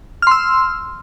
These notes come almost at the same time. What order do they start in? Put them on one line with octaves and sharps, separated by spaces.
F6 C6 E6